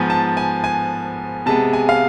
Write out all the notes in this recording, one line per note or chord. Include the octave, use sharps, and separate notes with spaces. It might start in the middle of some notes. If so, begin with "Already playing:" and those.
Already playing: G#2 F3 B3 G#5
A5
G#5
G#5
C3 G#3 B3 A5
G#5
F5